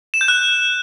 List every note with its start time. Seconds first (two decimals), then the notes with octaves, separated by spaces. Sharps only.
0.14 E7
0.21 G6
0.28 F#6